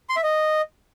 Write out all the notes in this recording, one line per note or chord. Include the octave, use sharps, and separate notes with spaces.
C6
E5
D#5